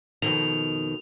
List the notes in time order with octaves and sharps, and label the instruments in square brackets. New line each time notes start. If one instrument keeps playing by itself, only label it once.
[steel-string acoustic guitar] F2 B2 D#3 [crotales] F7